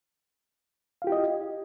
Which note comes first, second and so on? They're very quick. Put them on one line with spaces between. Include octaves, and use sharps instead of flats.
F5 F4 G4 E4 D#5